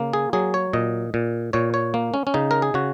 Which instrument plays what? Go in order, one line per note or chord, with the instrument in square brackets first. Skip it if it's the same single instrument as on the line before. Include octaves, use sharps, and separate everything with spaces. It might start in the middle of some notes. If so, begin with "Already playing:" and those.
Already playing: [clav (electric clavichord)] C#3 A#3
G#4
F#3 G#4
C#5
A#2 D#5
A#2
A#2 C#5
C#5
A#3
C#4
C#4
C#3 D#4
A#4
G#4
C#3 F#4